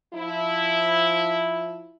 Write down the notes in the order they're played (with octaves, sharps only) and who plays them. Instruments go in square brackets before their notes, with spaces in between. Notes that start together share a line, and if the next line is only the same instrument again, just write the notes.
[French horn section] F3 E4